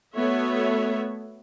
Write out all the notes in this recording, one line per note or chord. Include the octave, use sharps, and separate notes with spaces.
A3 B3 F#4 C#5 E5